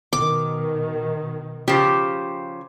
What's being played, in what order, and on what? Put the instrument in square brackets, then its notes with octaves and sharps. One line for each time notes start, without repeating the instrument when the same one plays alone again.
[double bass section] B2 D#3 [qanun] D6
[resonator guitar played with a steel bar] C#3 F3 [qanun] G4